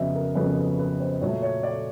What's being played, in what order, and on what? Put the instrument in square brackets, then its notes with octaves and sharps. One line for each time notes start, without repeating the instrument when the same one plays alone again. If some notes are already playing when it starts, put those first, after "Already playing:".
Already playing: [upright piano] F2 C#3 F#3 B3 D#5 E5
A#4
F2 C#3 F#3 B3 B4
B4
B4
C5
A#2 F#3 A3 C#5
C#5
D5